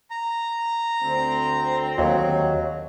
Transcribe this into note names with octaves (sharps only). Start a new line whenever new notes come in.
A#5
D2 C4
D#2 F#3